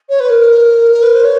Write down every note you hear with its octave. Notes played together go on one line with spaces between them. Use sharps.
C#5
B4
A#4
A#4
A#4
B4
C5
C#5